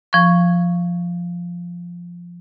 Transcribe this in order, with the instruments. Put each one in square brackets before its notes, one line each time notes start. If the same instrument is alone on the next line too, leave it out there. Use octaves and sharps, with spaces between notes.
[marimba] F3 C#6